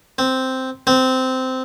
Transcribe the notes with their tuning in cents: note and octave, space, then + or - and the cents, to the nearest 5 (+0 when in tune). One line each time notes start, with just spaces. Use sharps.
C4 -5
C4 -15